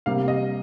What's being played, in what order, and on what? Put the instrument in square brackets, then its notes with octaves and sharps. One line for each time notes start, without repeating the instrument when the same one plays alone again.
[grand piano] C3 G3 A#3 F5
D#5